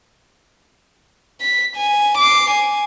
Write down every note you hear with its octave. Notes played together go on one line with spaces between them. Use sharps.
B6
G#5
D6 C7
G#5